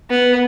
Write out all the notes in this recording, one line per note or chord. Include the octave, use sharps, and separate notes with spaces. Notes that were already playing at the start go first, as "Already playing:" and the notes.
B3